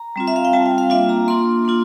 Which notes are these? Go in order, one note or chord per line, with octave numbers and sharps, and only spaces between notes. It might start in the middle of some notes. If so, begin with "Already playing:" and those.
Already playing: A#5
G3 C4 F4
E5
F5
G5
G3 C4 F4 A5
G5
F5
A#3 D4 F4 E5
A#5
A#3 D4 F4 C6
A#3 D4 F4